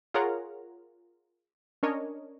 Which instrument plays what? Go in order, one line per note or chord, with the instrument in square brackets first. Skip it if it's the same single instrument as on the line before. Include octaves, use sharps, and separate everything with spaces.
[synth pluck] F4 G#4 A#4 C#5 F#5 A#5
C#4 D4 A#4 C#5 D#5